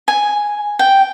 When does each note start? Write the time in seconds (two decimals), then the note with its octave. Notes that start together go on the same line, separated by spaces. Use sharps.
0.08 G#5
0.79 G5